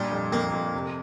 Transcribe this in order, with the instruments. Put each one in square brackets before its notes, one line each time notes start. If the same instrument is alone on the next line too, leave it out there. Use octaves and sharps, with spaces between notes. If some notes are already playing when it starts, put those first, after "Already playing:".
Already playing: [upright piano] A#2 D4 [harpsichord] G3
[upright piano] F2
[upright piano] F2 [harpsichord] A#3
[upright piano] F2
C3